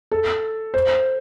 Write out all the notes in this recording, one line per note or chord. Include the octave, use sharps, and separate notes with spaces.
A4
C5